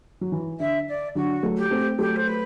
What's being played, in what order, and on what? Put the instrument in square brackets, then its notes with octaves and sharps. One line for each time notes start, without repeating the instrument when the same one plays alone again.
[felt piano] F#3
E3
[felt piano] D3 [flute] E5
[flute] D5
[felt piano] D3 F#3 [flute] F#4
[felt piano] F#3 A3
[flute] G4
[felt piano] A3 C4
[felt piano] F#3 A3 [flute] G4
[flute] C5
B4